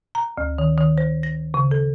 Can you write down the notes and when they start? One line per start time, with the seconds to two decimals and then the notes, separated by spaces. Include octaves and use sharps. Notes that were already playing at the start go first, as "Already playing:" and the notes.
0.15 A#5
0.38 D2
0.58 D#3
0.78 D#3
0.98 C5
1.23 A#6
1.54 C#3
1.71 A4